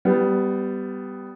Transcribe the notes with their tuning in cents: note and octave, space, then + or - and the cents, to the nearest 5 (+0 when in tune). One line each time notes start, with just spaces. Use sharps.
G3 -5 B3 +15